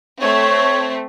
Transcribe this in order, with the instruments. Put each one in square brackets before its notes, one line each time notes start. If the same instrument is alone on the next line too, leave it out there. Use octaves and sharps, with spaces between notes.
[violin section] A3 C4 [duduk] C#5